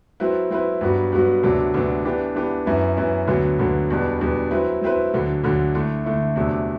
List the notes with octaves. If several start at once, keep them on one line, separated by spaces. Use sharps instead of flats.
F#3 C4 E4 B4
F#3 C4 E4 B4
G2 F#3 B3 F#4
G2 F#3 B3 F#4
D2 C3 F#3 B3 D4
D2 C3 F#3 B3 D4
E3 B3 D4 G4
E3 B3 D4 G4
F#2 E3 B3 E4
F#2 E3 B3 E4
D2 D3 F#3 B3
D2 D3 F#3 B3
E2 B2 G3 B3 D4
E2 B2 G3 B3 D4
F#3 C4 E4 B4
F#3 C4 E4 B4
D2 D3 F#3
D2 D3 F#3
D3 A3 E4
D3 A3 E4
E2 C3 F#3 A3 D4